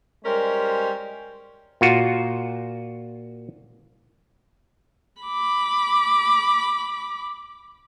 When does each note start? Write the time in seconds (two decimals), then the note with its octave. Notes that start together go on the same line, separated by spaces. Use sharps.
0.24 G3 G#3 C#4 A#4 C5
1.81 A#2 F4 F#4
5.22 B5 D6